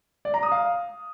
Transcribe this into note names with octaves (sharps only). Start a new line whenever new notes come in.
D5
A#5
D#6
F5